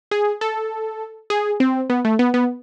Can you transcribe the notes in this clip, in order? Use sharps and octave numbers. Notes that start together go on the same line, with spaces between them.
G#4
A4
G#4
C4
B3
A3
B3
B3